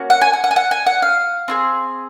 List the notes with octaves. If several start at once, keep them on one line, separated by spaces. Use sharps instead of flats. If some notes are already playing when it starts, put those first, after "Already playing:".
Already playing: A#3 C#4 F#4
F#5
G#5
F#5
F#5
G#5
F#5
G#5
F#5
F5
C4 F4 G#4